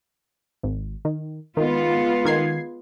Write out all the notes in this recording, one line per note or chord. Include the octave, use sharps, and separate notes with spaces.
G#1
D#3
D#3 G#3 B3 F4
D#3 G#6 C7